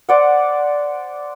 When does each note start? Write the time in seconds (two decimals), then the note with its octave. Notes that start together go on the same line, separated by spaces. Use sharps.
0.09 C5 D5 F#5